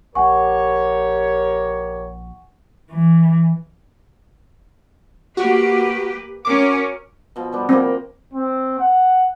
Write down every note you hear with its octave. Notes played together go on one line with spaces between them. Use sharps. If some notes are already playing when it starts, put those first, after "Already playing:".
A#1 G4 A#4 C#5 F#5 G#5 C#6
E3
A#3 F#4 G4 B4
C#4 F#4 A#4 D6
B2 F3
G3 B3 D4
F3 A#3 C4
C4
F#5